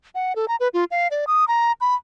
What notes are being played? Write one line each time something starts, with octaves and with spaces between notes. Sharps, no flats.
F#5
A4
A#5
B4
F4
F5
D5
D#6
A#5
B5